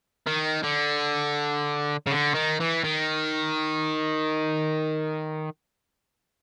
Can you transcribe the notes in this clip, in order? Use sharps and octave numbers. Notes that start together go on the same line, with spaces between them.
D#3
D3
C#3
D3
D#3
E3
D#3